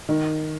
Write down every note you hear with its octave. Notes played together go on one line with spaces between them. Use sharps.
D#3